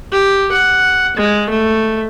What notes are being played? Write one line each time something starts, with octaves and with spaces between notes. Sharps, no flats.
G4
F#5
G#3
A3